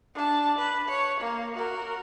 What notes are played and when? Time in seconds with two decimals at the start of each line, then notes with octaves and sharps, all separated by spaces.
0.15 D4 A5
0.59 B4
0.89 C#5
1.21 A#3
1.56 F#4 A#4